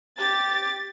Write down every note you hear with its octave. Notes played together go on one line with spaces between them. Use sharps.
G4 A6